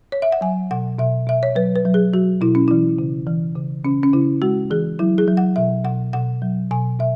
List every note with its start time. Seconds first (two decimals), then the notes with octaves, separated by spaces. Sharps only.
0.12 C#5
0.22 E5
0.32 F#5
0.41 F#3 G#5
0.71 B2 F#5
0.99 B2 E5
1.27 B2 E5
1.43 C#5
1.55 F#3 B4
1.76 B4
1.85 F#3
1.94 G#4
2.13 F#3 F#4
2.41 B2 E4
2.55 C#4
2.68 E3 E4
2.98 C#3
3.27 E3
3.56 C#3
3.85 C#3 C#4
4.03 C#4
4.13 C#3 E4
4.42 G#3 F#4
4.71 E3 G#4
4.99 F#3 E4
5.18 G#4
5.28 F#3
5.37 F#5
5.56 B2 E5
5.85 B2 F#5
6.13 B2 F#5
6.42 F#3
6.71 B2 G#5
6.99 B2 E5